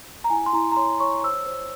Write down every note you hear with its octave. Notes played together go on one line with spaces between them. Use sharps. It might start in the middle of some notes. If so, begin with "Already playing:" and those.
A#5
E4 G#5
C6
E4 A#5
A#5
C#5 C6
C#5 C#6
C5 E6
C5